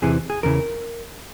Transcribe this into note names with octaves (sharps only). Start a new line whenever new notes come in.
E2 C3 E3 G#4
G#4
E2 C#3 E3 A#4